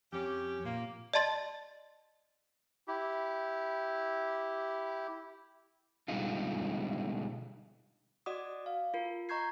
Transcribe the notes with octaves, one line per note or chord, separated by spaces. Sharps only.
F2 C#4 G4
A#2 A#3
D5 D#5 A5 C6 A6
E4 G4
B2 D3 G3 G#3 D#4 F4
F#4 D5 D#5 F#5 D6 D#6
F5
F4 A#4
D#5 A#5 C#6 G6 G#6 C7